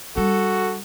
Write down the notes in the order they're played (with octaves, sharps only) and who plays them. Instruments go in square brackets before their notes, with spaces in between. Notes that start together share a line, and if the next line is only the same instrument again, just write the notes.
[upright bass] G3 D4 [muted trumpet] F#4 [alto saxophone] A4